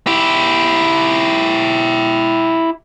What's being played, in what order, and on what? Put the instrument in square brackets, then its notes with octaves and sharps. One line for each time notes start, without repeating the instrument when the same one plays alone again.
[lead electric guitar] E4 G4